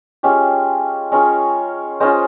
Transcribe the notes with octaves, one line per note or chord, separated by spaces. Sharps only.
G#3 C#4 F4 G4
G#3 C#4 F4 A#4 C#5
G#3 C#4 F4 C5 D#5